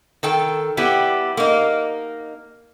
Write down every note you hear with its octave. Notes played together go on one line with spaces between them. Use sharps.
D#3 A4 G5
G3 B3 E4 G4
A#3 D#4